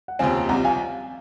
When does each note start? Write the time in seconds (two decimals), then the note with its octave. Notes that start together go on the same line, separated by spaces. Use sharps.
0.08 F#5
0.19 F1 D#2 C#3 F3 C4 F5 G#5
0.49 C2 C3 F3 F#5 A#5
0.65 F5 G#5